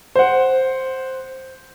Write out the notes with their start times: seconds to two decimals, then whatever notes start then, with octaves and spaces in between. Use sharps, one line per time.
0.16 C5 F#5